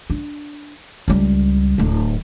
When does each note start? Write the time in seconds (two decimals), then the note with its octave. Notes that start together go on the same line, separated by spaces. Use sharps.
0.10 D4
1.08 C#2 G3
1.78 D1 D2